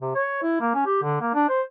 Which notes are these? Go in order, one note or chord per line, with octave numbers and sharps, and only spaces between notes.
C3
C#5
E4
A#3
C#4
G4
D3
A#3
D4
C5